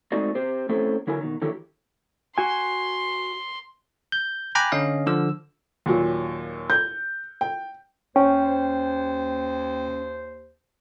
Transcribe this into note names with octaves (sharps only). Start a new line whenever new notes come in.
G#3 A3 C4 D#4 F#4 D5
C4 G4 C5
A3 C4 C#4 E4 A4 C5
D3 F#3 E4 A#4 G#5
B2 D#3
D3 D#3 F#3 E4 G4 A4
F#4 G#5 C6
G6
G5 G#5 A#5 B5 D6 F#6
D3 C#4 D#5 F5
D3 F3 E6
D#2 A#2 F#3
G6
G5
D#2 C#4 C5 G5